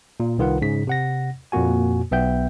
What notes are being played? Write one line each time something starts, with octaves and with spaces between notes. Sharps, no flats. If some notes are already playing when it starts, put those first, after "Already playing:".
A#2
C2 D#3 F4 B4 F#5
G#2 C#3 B6
C3 F#5 A#6
F2 A#2 A#3 F#4 G#5
B1 B3 E5 G5 G6